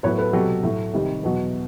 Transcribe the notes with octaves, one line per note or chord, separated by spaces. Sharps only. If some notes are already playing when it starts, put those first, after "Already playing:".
A2 F#3 B3 B4 C#5
A4 B4
C2 B2 F#3 G4 A4
A2 F#3 A3
C2 C3 D#3 G3
E2 B2 F#3